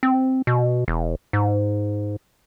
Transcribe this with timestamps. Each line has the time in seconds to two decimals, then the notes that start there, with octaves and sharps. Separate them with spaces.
0.03 C4
0.47 B2
0.88 E1
1.33 G#2